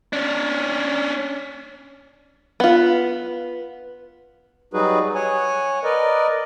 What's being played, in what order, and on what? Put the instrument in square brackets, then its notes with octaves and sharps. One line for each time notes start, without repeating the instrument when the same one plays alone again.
[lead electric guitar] C#4 D4
[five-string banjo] B3 F4
[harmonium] F#3 G3 D#4 F#4 G#4 B4
C#5 F#5 G#5
A#4 B4 D5 D#5